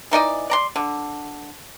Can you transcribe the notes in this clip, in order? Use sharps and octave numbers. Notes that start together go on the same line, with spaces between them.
E3 D#4 D5 D#5
D5 A#5 C6
D3